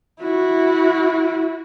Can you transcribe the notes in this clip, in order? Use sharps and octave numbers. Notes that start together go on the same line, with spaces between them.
E4 F#4